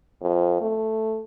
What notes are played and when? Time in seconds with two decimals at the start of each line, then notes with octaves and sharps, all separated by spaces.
0.22 F2
0.61 A3